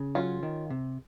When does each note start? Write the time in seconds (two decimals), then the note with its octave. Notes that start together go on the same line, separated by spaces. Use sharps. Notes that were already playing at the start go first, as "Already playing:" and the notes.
Already playing: C#3
0.15 F#3 C#4 F4
0.43 D#3
0.70 C3